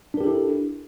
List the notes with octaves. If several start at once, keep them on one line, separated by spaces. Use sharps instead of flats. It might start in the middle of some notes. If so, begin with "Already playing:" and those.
D4 E4 G4 A4 A#4